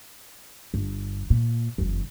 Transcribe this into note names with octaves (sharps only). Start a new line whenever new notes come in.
G1
A#2
F#1 E2